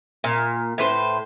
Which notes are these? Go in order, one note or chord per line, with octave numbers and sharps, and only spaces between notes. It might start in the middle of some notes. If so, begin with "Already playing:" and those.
A#2
A2 B4 C5